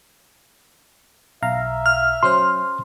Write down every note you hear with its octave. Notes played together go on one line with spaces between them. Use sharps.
B1 E5 F5 A#5
F6
F#3 C#4 C5 C6